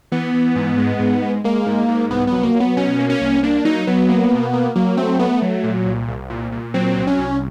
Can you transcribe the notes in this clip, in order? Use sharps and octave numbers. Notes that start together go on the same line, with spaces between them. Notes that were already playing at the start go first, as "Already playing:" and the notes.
E3 B3
E3
G#2
G#3
G#2
G#3
G#3 A#3
G#2
G#2
C2 B3
B3
F#3
A#3
F#3
B3
B2 C#4
A#3
C#4
C2
A#3 D4
F#3 D#4
F#3 B3
A#3
B2
A#3
F#3 A#3
A3 C4
A3 B3
F#3
A#2
C2
C2
A#2
A#2
F#3 C4
C2
C#4
C2